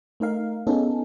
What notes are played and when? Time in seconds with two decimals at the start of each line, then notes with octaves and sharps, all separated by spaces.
0.20 A3 D#4 A#4 F5
0.67 B3 C#4 D#4 G#4 A4